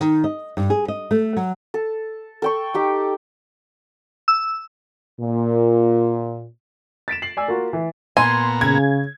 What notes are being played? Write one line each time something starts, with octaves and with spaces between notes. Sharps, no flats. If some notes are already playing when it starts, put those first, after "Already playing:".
D#3
D#5
G2
G#4
D#5
A3
F#3
A4
A4 G5 C#6
D#4 G4 D6
E6
A#2
A6 B6 D7 E7
C7 F#7
D5 G#5 E6
A#3 F4 F#4
E3
A#2 B3 G#5 A#5 C6
C#3 G#6